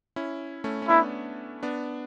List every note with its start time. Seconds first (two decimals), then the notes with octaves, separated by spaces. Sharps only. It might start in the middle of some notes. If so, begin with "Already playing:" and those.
0.16 C#4 E4
0.64 A3 C#4
0.82 C#4
0.89 B3 D4 E4
1.63 B3 D4